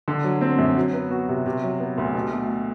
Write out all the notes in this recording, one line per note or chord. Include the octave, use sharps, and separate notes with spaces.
D3
F#3
C4
F#2
F#3
B3
F#4
C3
C3
F#3
B3
D2
B2
A3